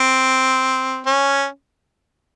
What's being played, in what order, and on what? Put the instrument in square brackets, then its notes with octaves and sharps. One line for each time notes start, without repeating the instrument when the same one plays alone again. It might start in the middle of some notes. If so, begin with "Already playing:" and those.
Already playing: [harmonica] C4
C#4